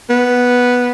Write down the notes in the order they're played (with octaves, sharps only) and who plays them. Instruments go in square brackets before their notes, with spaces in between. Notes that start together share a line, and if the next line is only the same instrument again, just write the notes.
[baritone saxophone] B3